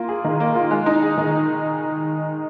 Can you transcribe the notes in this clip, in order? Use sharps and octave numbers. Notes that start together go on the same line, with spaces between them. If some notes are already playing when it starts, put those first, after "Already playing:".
Already playing: A#3 F4
G#4
D#3
A#3
F4
G#3
D#4
G#4
D#3